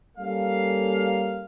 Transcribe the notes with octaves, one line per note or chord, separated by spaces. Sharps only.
G3 A#3 C#4 A4 F5